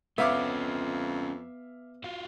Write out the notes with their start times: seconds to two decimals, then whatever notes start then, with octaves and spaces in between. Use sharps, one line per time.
0.18 F2 B3 C#4 F4 E5 F5 D6
2.04 F4 F#4 F5